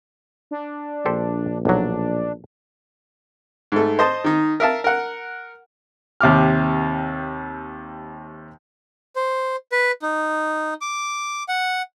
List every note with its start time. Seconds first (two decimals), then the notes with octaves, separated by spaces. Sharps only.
0.51 D4
1.06 A#1 G4 A4 C5
1.65 B1 F#3 D4
3.72 G#2 A3
3.99 C5 D#5 A5
4.24 D#3 D#4
4.60 A#4 E5 F5 A5
4.84 A#4 F#5
6.21 D#2 C3 D6 F6
9.16 C5
9.72 B4
10.02 D#4
10.81 D6
11.48 F#5